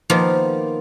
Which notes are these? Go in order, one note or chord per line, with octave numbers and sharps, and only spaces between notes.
D#3 F3 A#3 B3 F4